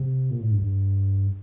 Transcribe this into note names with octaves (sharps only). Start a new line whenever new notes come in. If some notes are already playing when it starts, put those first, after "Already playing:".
Already playing: C3
A#2
A2
G2
G2